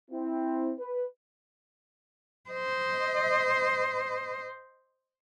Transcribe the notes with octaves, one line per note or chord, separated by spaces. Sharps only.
C4 E4
B4
C5 D#5